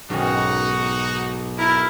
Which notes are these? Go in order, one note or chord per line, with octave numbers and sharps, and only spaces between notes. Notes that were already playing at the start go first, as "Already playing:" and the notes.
B1 G#2 D#3 C#4 D#4 F#4
E4 A#4